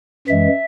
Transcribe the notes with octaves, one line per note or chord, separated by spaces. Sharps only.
F#2 E3 G#3 E5